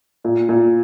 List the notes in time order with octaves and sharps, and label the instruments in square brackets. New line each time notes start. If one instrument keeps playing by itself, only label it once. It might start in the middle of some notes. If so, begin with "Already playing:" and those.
[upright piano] A#2
A#2